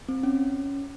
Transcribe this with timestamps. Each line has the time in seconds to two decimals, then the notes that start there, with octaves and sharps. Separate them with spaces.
0.09 C4
0.23 C#4